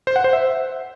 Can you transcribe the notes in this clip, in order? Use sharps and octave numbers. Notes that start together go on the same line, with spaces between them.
C5
F#5
C5
E5